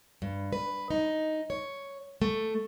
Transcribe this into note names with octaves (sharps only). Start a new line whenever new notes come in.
G2
B4
D#4
C#5
A3